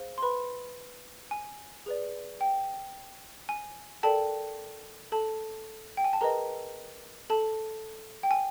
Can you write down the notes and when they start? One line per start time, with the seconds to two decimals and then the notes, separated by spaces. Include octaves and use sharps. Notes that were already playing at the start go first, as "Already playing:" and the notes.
Already playing: G#4 C5 F5
0.18 C6
0.22 B4 B5
1.31 G#5
1.86 G#4 B4 D5
2.41 G5
3.49 G#5
4.03 A4 A#4 D5 G5 A5
5.12 A4 A5
5.97 G5
6.04 G#5
6.13 A5
6.21 G#4 A#4 B4 D#5 A#5
7.30 A4 A5
8.23 G5
8.31 G#5